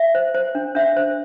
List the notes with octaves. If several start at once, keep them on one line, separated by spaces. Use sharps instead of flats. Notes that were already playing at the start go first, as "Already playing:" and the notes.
Already playing: E5
C5
C5
D4
D4 E5
C5